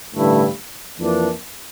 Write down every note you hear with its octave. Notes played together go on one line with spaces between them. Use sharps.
A1 G2 D3 A3 E4
F2 E3 A#3 D4